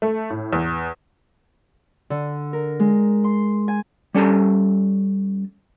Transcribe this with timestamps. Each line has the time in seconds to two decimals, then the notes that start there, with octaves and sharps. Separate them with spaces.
0.02 A3
0.30 A2
0.53 E2
2.10 D3
2.53 A#4
2.80 G#3
3.24 C6
3.68 G#5
4.14 G3 C#4 A4 A5 A#5